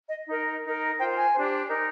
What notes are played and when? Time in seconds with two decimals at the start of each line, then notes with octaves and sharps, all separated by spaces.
0.09 D#5
0.26 D#4 A#4
0.62 D#4
0.67 A#4
0.98 F4 C5 G5
1.15 G#5
1.33 D4 G4 C5
1.68 D#4 A#4